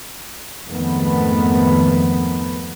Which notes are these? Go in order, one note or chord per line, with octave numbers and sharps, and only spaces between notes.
F2 G#2 D#3 A3 B3